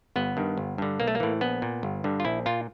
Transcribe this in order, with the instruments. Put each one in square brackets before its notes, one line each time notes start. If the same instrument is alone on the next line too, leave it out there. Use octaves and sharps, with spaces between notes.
[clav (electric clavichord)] G1 B3
G2 D#3
G1
G2 D3
B1 A#3
A3
A#3
A2 E3
A#1 B3
A#2
G1
G2 D3
F4
A#1 E4
A#2 F4